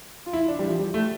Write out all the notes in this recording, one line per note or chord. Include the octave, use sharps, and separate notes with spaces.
F4
E4
D4
G3
F3
G3
A3